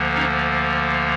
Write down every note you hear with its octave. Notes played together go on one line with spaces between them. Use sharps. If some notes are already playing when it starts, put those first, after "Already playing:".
Already playing: D2 D3 F3 A#3
C#4 D#4